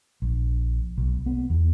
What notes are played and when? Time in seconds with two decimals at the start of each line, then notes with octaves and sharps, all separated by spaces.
0.22 A#1
0.98 B1
1.26 B3
1.50 E2